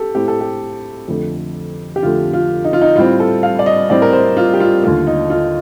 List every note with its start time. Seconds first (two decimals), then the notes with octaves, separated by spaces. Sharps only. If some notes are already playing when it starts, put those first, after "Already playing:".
Already playing: G4 A4
0.15 A2 A3 C4 G4
0.28 A4
0.41 G4
1.08 F2 D3 A3
1.96 G4
2.02 F2 D3 A3 F4
2.33 F4
2.64 D#4
2.73 F4
2.82 D#4
2.96 A2 G3 C4 F4
3.20 A4
3.43 F5
3.59 D5
3.66 D#5
3.90 A2 G3 C4 D5
4.02 A#4
4.13 C5
4.37 F4
4.54 G4
4.60 F4
4.83 D#2 D3 A3 F4
5.07 D#4
5.30 F4